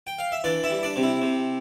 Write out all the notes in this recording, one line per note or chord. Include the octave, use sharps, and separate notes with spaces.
G5
F5
E5
E3 D4 D5
E4 E5
G3
D4 D5
C3
E4
C3